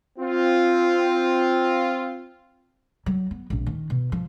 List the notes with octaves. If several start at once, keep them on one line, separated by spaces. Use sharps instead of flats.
C4 F4
F#3
B3
D1 A#1
D#3
B2
F3